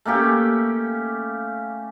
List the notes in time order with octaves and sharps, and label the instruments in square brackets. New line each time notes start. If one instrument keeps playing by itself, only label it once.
[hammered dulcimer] A3 A#3 C#4 G4